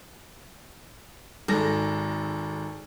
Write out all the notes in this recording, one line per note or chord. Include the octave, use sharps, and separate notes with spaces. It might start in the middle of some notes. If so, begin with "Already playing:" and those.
G#1 G#3 A4 A#6